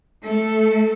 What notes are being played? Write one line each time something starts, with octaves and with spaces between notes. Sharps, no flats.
A3 A4